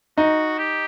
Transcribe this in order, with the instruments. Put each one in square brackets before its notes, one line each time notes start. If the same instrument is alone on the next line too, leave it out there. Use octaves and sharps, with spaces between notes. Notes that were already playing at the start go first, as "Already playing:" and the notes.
[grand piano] D#4 [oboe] F#4
[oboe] G4